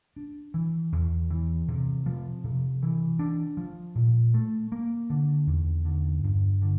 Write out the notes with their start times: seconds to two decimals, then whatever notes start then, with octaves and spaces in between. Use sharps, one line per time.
0.16 D4
0.54 E3
0.92 E2
1.31 E3
1.68 C3
2.06 F3
2.44 C3
2.82 E3
3.19 D4
3.57 F3
3.95 A#2
4.34 A3
4.72 A#3
5.10 D3
5.47 E2
5.85 D3
6.24 G2
6.62 D3